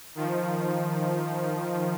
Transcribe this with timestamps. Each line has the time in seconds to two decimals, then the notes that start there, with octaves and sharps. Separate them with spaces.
0.15 D#3 F3